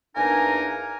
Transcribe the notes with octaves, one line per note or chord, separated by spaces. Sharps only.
E2 A#3 D4 D#4 A#4 G#5